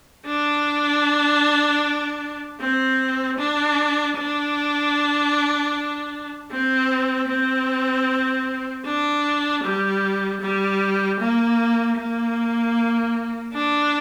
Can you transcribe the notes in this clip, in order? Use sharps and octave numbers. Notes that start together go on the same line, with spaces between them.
D4
C4
D4
D4
C4
C4
D4
G3
G3
A#3
A#3
D4